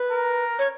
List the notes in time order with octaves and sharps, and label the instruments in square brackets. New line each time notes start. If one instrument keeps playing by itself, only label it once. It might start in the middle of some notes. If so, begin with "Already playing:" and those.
Already playing: [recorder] B4
[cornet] A#4
[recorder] C#5